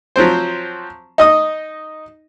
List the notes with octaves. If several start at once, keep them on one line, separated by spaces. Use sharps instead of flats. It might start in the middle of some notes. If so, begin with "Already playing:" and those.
F3 F#3 C4 C5
D#4 D#5 D#6